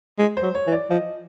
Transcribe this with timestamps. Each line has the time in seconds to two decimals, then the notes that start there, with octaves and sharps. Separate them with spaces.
0.19 G#3
0.37 C5
0.42 F#3
0.55 C#5
0.67 E3
0.72 D5
0.90 F3 D#5